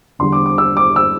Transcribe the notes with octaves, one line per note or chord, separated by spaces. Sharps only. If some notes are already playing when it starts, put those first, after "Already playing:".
E2 D3 G3 C6
D6
D6
E6
D6
E6